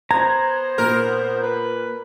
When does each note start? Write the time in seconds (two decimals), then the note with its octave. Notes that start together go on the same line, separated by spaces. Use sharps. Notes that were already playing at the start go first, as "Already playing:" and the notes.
0.11 B3 C5 A#5 G#6
0.78 A#2 A#4
1.43 B4